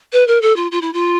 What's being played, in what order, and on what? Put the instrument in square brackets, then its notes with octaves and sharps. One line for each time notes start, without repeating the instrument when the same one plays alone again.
[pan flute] B4
A#4
A4
F4
F4
E4
F4